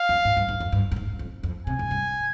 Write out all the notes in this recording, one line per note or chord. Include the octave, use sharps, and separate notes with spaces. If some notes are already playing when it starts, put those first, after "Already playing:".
Already playing: F5
F2
G#2
G2
G2
F2
G2
G2
G#2
F2
F2
C3 G#5
G#2
G2